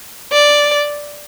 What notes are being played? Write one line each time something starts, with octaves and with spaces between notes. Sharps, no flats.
D5